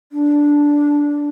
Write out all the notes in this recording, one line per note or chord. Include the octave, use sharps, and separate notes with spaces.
D4